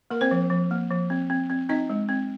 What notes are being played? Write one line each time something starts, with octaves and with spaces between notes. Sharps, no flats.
A#3 A#4
C4 C5
F3
F3
A#3
F3
C4
C4
C4
C4 D#4 D#5
G#3
C4